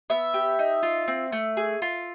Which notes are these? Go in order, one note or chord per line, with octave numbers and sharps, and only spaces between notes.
B3 E5
G4
D#4
F4
C4
A3
G#4
F4